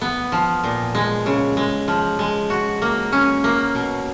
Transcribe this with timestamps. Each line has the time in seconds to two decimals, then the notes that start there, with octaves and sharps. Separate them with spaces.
0.01 B3
0.32 F3
0.64 A#2
0.95 G#3
1.26 C#3
1.57 G#3
1.88 F3
2.19 G#3
2.50 F#4
2.82 A#3
3.12 C#4
3.44 A#3
3.75 B2